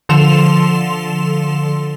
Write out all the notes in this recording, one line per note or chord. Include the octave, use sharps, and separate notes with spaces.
D3 F3 A4 C6 E7 F7